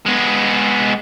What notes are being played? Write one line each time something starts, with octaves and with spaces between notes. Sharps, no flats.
G#3 B3